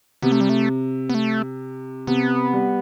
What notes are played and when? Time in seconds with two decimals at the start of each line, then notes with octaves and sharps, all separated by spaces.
0.22 C3 B3
0.32 A3
0.41 G3
0.49 A3
1.10 B3
1.15 A3
2.07 C3 B3
2.53 G3